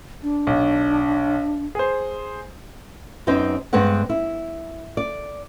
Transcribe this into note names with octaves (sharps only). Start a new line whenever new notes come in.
D4
B1
G#4 C5
F#2 B3 C4 D#4 C5
G2 G#3 B3 C4 F#5
E4
D5